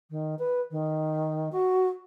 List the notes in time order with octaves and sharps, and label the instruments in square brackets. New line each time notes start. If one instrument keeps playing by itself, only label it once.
[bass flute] D#3
B4
D#3
F#4